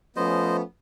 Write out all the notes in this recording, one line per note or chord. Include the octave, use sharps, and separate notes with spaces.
F3 A3 B3 C#4 C5 D#5